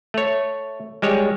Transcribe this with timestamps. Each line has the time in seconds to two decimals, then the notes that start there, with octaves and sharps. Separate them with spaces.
0.14 A3 C#5
1.02 G3 G#3 C#5